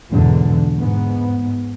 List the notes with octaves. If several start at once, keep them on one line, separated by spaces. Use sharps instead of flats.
E2 G#2 B2 D3
G#2 B3